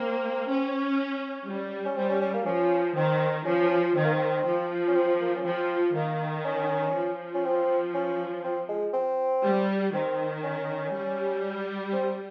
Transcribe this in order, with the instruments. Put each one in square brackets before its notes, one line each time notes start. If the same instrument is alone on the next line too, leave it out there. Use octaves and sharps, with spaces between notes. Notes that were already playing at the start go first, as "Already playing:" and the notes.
Already playing: [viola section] A#3 [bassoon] C4
[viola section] C#4
G3
[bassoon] C#4
[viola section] G3 [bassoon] C4
[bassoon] C#4
C#4
A#3
[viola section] F3 [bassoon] C#4
[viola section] D#3 [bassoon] C4
[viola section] F3 [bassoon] C#4
[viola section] D#3 [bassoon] C4
[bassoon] A#3
C4
[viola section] F3
[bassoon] C#4
C4
A#3
C#4
[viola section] F3 [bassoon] C4
[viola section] D#3 [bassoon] A#3
[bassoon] C#4
[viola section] F3
[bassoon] C#4
C4
C#4
C4
G#3
C4
[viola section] G3
[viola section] D#3 [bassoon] C4
[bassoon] C#4
[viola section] G3
[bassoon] C4